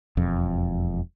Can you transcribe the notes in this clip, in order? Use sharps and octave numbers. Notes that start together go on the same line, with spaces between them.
E1 F2